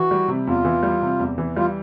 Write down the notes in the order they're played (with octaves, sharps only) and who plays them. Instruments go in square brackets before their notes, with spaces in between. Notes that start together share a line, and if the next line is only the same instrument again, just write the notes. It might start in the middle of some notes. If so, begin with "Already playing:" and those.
Already playing: [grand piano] E3 [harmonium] F#4
[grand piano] G3
C3
[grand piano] E2 [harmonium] F4
[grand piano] E3
G3
C3
E2
E3
[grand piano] G3 [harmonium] F4